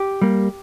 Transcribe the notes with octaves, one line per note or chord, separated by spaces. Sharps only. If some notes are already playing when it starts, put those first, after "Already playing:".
Already playing: G4
G3 A#3